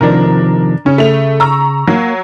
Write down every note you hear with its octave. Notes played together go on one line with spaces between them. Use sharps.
C3 D#3 F3 D4 A#4
C#3 C#4
A3 F7
A#5 C#6 E6
F#3 A#3